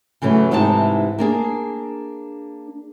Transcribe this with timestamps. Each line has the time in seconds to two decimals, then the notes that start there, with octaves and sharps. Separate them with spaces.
0.22 C#3 E3 F#3 A3
0.51 G#2 C3 E3 D#4 E4 A5
1.19 A#3 D4 G#4